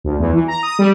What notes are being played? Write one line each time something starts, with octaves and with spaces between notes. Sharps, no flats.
D2
E2
E3
A#5
D#6
G3